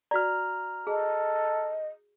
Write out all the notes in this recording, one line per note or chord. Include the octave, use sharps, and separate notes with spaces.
F#4 D5 A#5 F6
G#4 A4 D#5